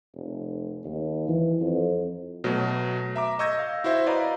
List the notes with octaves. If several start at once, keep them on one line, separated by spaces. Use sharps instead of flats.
F1
D#2
E3
F2
B2 F#3 A3
E5 A#5 D6
D#5 C#6 E6 G6 G#6 A#6
F5
E4 F#4 C5 E5
B4 D5 D#5 F5 A#5 B5